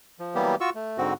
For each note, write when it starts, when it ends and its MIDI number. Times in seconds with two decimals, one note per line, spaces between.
0.19 0.35 53
0.35 0.55 52
0.35 0.55 54
0.35 0.55 55
0.35 0.55 58
0.35 0.55 59
0.35 0.55 67
0.61 0.70 65
0.61 0.70 66
0.61 0.70 85
0.61 0.70 88
0.75 0.98 57
0.98 1.13 44
0.98 1.13 50
0.98 1.13 60
0.98 1.13 66